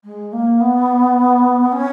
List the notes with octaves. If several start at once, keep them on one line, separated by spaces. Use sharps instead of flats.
G#3
A#3
B3
C#4